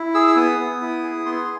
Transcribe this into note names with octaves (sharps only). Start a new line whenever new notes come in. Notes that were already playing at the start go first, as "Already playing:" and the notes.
Already playing: E4
G#4 E6
E6
B3 D#6
B3
E4
G#4
B3 C6